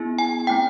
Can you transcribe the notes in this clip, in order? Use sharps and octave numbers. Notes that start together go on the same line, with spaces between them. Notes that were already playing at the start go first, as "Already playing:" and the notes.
Already playing: B3 E4 G#4
G#5
A3 C4 E4 G5